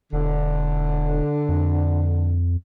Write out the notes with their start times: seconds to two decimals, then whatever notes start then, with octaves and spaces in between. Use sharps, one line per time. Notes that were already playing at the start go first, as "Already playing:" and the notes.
0.13 E1 D3
1.49 F2